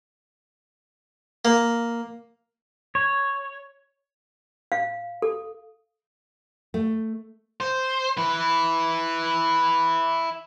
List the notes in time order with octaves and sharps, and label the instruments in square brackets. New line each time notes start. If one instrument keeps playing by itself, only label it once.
[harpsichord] A#3
[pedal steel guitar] C#5
[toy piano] F5
A4
[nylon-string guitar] A3
[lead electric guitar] C5
E4 B4